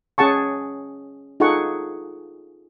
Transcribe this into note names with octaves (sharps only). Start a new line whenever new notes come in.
C#4 G#4 F#5 A5 C#6
D#4 F4 G#4 A4 F#5 C#6